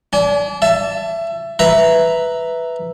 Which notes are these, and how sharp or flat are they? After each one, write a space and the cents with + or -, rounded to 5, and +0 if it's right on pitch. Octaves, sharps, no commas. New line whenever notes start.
D4 -30 G#5 +30
E5 +25 A5 +0
B4 +0 E5 +0 A#5 +0